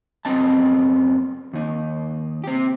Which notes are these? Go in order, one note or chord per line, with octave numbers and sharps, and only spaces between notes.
F#2 B3 C4 D#5 A5
D#2 D#4
C4 G4